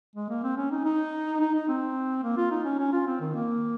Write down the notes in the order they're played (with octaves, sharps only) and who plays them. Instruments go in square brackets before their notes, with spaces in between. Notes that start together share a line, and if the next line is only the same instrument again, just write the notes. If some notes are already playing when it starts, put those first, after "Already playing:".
[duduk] G#3
A#3
C4
C#4
D#4
D#4
D#4
D#4
C4
A#3
F4
D#4
C#4
C#4
F4
C4
D#3
A#3